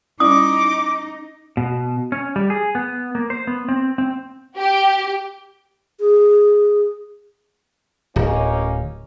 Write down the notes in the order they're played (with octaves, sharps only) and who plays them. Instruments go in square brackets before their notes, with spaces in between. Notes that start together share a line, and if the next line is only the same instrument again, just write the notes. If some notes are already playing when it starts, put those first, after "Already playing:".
[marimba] C#4 E4 D5 [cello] D#4 [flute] D6 [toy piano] D#6
[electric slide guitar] B2
C#4
G3
G#4
B3
A#3
C5
B3
C4
C4
[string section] G4
[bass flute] G#4
[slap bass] D1 [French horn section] A#3 C#4 D#4